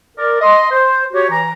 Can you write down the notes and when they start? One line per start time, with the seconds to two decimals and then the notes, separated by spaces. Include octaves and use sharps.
0.18 A#4 D5
0.42 D#5 C6
0.72 C5
1.13 F#4 G4 C#5
1.30 E3 A#5